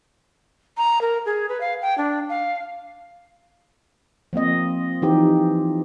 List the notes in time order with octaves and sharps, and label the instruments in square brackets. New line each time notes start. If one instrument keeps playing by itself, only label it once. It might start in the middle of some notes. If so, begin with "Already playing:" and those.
[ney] A#5
A#4
G#4
B4
F5
G5
D4
F5
[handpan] F3 A#3 C4 D#5
E3 F3 D#4 G4